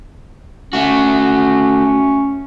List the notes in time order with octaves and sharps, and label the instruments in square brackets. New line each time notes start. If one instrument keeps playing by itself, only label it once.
[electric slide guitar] A3 F#4 [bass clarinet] C#4